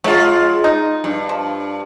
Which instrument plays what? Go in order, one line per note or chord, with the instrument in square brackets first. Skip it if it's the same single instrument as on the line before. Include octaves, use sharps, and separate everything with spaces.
[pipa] F#3 [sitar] G#3 F4
[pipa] D#4
[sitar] G2
[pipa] F3